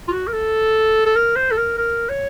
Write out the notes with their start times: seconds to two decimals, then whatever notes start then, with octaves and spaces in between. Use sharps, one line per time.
0.08 F4
0.12 F#4
0.27 A#4
0.33 A4
1.06 A4
1.16 A#4
1.36 C5
1.51 A4
1.57 A#4
1.78 A#4
2.09 C#5